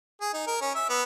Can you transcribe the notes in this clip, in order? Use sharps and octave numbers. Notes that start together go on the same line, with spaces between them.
G#4
D#4
A#4
C#4
E5
B3